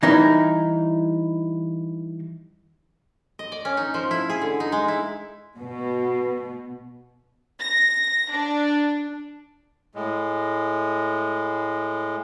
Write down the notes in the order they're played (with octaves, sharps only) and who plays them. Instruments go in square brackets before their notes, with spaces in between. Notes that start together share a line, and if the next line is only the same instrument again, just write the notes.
[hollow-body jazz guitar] E3 G3 D#4 E4 A#4
[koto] D#5
D5
C#4
D#4
F3
E4
G#4
D3
D#4
G#3
E4
[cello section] B2
[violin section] A#6
D4
[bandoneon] A2 G#3